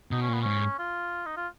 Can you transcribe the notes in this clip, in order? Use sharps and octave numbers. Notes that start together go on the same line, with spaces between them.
B2 D#4
C#4
A#2 B3
G#2 C#4
F4
D#4
F4